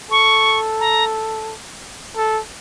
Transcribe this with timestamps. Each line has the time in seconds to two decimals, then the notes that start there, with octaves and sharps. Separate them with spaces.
0.10 A4 C#6
0.80 A#5
2.16 A4